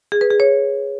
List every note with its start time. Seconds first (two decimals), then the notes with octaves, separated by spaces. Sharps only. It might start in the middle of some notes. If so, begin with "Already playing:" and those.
0.12 G#4
0.21 B4
0.30 G#4
0.40 C#5